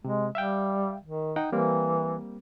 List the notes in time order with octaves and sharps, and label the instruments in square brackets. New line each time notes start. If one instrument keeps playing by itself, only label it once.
[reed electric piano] C3 [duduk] G#3
[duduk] G3 [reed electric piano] E5 F5 G5
[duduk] D#3
[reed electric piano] D#4 F#5 G5
[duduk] E3 [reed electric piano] G3 A#3 C4